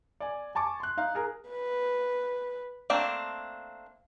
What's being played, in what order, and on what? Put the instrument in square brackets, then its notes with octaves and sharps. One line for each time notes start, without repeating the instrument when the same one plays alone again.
[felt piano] D5 G#5
G#5 A5 C#6 D6
C6 F#6
D#4 F5
G#4 A#4
[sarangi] B4
[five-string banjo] A3 A#3 C4 D4